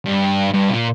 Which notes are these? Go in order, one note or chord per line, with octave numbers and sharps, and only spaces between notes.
G2
G2
A#2